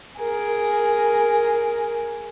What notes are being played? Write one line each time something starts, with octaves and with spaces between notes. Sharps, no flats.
G#4 A#4